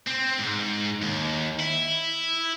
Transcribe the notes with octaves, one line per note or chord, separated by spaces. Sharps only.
C4
G#2
D#2
E4